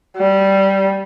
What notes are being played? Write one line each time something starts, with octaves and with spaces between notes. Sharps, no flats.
G3